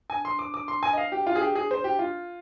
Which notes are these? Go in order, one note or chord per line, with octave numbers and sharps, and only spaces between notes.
G#5
C6
D6
D6
C6
G#5
D#5
F5
G4
F4
G#4
G4
G#4
C5
G4
F4